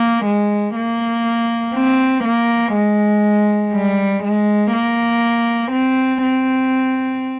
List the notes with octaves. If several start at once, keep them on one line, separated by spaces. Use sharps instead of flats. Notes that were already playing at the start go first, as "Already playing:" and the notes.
Already playing: A#3
G#3
A#3
C4
A#3
G#3
G3
G#3
A#3
C4
C4